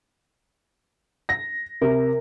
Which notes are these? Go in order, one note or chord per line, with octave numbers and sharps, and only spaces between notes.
A#6
C3 A#4